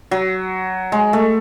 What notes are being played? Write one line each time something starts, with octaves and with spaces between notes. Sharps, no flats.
F#3
G#3
A3